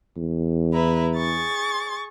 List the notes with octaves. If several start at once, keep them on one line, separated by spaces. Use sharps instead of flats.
E2
E4 B4 A#5
G#4 C#6 A6